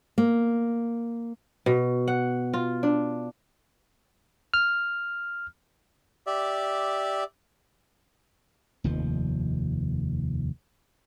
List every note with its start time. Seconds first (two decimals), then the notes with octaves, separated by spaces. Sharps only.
0.18 A#3
1.66 B2
2.08 F#5
2.54 F4
2.83 D4
4.54 F6
6.27 G4 D5 E5
8.84 F1 D#2 F3